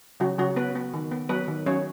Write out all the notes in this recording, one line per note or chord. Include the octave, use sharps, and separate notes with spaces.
C#3 F#3 F#4
C#3 F#3 F#4
B3 B4
B3
D#3
B3
F#3 B3 B4
D#3
F#3 C#4 C#5